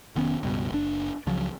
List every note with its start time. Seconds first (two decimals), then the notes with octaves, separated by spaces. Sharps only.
0.15 F1 D#3 B3 C#4
0.43 C#2 G2 B2
0.70 F#1 D4
1.26 C#2 C#3 F3 F#3